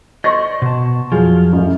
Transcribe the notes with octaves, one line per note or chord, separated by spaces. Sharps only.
C5 D5 D#5 C6 C#6 A#6
B2 A5
F2 F3 F#3 F4 G#4
A1 F#2